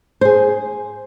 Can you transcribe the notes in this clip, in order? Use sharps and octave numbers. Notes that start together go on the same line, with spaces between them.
G#4 C5